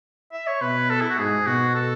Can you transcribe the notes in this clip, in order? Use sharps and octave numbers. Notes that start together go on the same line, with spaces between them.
E5
C#5
B2 B4
A4
E4
F#4
G#2 G#4
B2 F#4
A4